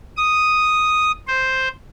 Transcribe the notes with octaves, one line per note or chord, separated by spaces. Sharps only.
D#6
C5